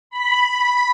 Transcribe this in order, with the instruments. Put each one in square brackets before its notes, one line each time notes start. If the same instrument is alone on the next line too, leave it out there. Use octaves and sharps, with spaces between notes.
[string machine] B5